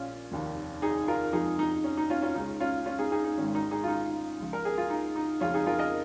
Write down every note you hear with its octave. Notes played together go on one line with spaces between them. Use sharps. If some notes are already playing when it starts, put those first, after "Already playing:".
Already playing: A#1 A#2 C#4 F4
F1 D#2 D#3
D#4 G#4
F4 A#4
F2 F3 G#3 D#4 G#4
D#4
C#4
D#4
C#4 F4
C#4 F4
C#2 C#3 G#3 D#4
C#4 F4
C#4 F4
D#4 G#4
D#4 G#4
D#4
G#1 G#2 D#3 G#3 C#4
D#4
D#4 G#4
F4
D#4
C#2 C#3 F3
A#4
G#4
F4
D#4
D#4
F2 C#3 F3 G#3 C#4 F4
D#4 G#4
F4 A#4
A#4 D#5